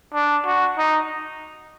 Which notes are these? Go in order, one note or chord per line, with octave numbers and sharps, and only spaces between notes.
D4
F#4
D#4